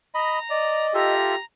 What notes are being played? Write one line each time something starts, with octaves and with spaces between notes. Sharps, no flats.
D#5 A#5 B5
D5 D#5
F4 G4 A4 E5 A#5